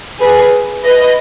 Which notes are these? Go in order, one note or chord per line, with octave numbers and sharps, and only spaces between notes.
G#4 B4
B4 D#5